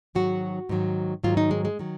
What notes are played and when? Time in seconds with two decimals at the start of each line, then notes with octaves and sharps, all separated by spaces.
0.15 G#2 D#3 F#3 F#4
0.69 G#2 D#3 F#3
1.24 G#2 D#3 F#3 F4
1.37 D#4
1.51 G#3
1.65 G#3
1.79 D#3 F#3